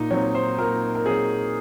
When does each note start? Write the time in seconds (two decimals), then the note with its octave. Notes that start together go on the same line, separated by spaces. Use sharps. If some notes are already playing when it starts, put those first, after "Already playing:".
Already playing: A#2 D#4
0.11 F#3 C4 C#5
0.35 C5
0.58 A#2 A#4
0.95 A#4
1.06 F#3 C4 G#4